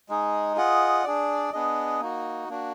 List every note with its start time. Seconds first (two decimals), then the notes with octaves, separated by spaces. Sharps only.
0.09 G#3 D#4 G#4
0.56 F4 G#4 D#5 F#5
1.04 D4 G#4 D5
1.53 B3 D4 G#4 D#5
2.00 A#3 D#4 F#4
2.48 A#3 D4 F#4